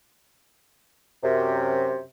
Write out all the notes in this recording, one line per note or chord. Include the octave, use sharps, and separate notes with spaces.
F#2 C3